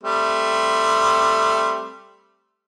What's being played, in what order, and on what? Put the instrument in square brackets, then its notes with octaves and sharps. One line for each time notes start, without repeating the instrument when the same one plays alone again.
[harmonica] G3 A3 C4